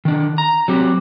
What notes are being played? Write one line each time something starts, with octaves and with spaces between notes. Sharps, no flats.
D#3 D4
A#5
F#3 C4 G4